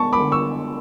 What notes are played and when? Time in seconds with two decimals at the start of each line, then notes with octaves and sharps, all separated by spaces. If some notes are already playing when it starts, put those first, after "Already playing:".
Already playing: G#3 B3 A5 C#6
0.13 B5 D6
0.20 D3
0.32 C#6 E6